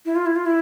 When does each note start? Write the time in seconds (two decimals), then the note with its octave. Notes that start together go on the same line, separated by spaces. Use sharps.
0.06 E4
0.16 F4
0.26 E4
0.36 F4
0.46 E4